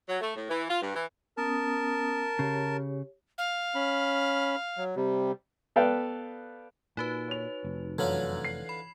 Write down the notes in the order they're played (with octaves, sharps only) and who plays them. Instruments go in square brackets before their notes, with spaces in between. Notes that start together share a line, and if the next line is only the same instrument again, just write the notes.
[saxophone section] F#3
A3
A2
E3
F4
G2
E3
[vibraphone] B3 C#4 D#6 [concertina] A#4 A5
[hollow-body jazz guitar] C#3 [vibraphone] G4 C#5
[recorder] F5
[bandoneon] C#4 B5
F#3
C3 G3
[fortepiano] B3 A4 B4 D5 F5 G5
[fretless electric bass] A#2 [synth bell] D#4 F#4 B4
[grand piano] C#5 F7
[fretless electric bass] F1
[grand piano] F#2 [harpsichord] D3 E3 F4 [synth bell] G#6 F#7
[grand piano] C7
[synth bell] B5